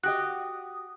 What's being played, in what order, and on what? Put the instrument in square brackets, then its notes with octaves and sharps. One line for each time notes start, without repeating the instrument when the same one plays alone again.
[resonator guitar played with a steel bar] F#4 G4 D#5 [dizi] D#6 [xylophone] F#6